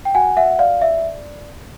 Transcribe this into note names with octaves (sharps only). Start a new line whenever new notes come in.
G5
F#4 F#5 G#5
E5 F#5
D5 F5
E5